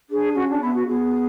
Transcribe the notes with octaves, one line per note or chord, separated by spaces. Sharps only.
D4 G#4
C#4 F#4
D4
B3 E4
F#4
B3 G#4